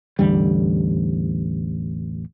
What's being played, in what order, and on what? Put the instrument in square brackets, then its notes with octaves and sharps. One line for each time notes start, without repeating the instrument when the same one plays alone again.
[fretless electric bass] A1 E2 D3 G3